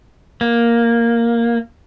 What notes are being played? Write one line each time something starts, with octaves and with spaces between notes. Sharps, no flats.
A#3